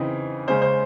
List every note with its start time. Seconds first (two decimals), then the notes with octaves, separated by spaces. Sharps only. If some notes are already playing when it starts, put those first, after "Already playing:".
Already playing: C#3 E3 C4 D#4
0.48 C#3 G#3 C#4 C5
0.62 C5